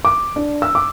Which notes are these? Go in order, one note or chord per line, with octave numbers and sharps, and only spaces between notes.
D6
D4
E6
D6